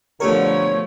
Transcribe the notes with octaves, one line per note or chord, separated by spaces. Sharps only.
B2 D3 F3 A3 G4 A#4 C#5